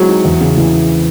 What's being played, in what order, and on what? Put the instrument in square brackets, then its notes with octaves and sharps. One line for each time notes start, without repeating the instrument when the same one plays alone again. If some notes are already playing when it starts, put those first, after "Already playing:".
Already playing: [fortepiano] F#3 [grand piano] G#3 C4 E4
[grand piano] D#4
E2
C#3
E3